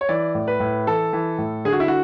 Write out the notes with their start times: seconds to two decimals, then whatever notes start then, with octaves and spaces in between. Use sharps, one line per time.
0.01 C#5
0.09 E3 D5
0.35 A2
0.48 B4
0.60 A2
0.87 E3 A4
1.13 E3
1.38 A2
1.65 D3 G#4
1.73 F#4
1.80 E4
1.88 F#4